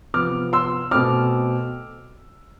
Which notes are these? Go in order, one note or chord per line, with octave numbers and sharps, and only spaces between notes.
C3 F3 B3 D6 F6
C6 E6
B2 A3 C4 D6 F6